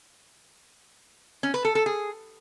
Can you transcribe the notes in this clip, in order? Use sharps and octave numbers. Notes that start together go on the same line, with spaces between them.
C#4
B4
A4
A4
G#4